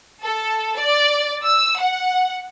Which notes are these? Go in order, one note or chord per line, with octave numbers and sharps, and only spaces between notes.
A4
D5
E6
F#5